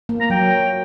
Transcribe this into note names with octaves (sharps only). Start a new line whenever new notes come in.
A#3
A#5
F#3 G5